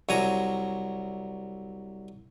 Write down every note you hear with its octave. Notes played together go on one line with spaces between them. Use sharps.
C2 F#3 G#5 A#5